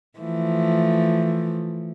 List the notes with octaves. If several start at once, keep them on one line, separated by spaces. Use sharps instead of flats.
E3 F3 A3